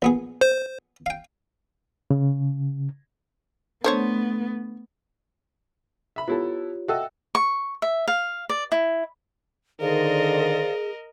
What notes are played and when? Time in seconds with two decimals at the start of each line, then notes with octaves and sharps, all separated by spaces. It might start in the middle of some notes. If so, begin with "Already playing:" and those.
0.02 A#1 B3 G#4
0.41 C5
1.06 F5 G5
2.11 C#3
3.84 D3 A3 B3 C5 C#5
6.16 E5 B5
6.28 B3 E4 F4 G4 A4 C#5
6.88 F#4 A4 D#5 E5 G5 E6
7.35 C#6
7.82 E5
8.08 F5
8.49 D5
8.72 E4
9.81 D3 D#3 G#4 A#4 C5 D5 D#5 F5